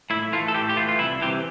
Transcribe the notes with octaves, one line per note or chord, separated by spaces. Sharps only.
A2 E4
E3 A3 F4
A4
A2 G4
G4
E3 A3 F4
F4
C2 E4
C3 E3 G4